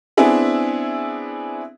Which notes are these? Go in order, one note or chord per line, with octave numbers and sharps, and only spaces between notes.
B3 C4 D4 E4 G#4 E5